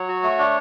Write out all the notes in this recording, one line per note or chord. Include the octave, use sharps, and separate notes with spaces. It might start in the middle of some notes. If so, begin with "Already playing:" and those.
Already playing: F#3 C#5
F#4
A3
D4